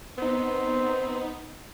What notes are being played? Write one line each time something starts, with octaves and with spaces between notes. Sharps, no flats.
B3 C4 D#4